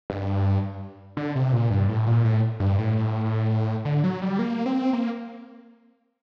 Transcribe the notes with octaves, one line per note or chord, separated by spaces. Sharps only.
G2
D3
C3
A#2
G2
A2
A#2
A2
G2
A2
D3
F#3
G3
A#3
C4
A#3